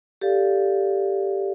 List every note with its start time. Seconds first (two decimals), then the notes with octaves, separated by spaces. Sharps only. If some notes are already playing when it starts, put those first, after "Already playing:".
0.21 G4 A4 D5 F5